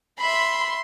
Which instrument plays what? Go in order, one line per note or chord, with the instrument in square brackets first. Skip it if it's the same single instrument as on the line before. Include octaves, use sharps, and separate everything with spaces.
[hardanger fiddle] E5 [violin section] B5 [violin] C6